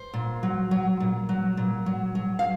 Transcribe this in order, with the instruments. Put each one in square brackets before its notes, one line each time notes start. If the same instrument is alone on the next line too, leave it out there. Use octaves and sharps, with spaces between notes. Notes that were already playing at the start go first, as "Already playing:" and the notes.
Already playing: [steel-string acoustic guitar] C5
A#2
F#3
F#3
A#2
F#3
A#2
F#3
F#3
F5